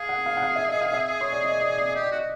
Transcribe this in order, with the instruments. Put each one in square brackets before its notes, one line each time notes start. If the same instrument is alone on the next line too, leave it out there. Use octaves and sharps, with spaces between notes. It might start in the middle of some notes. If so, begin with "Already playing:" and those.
Already playing: [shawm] G#4 [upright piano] F5
[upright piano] F#5
F5
F#5
F5
E5
D#5
F5
E5
C#5
D5
D#5
D5
D5
D#5
[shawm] G4
[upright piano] D5
[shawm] F#4 [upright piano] D#5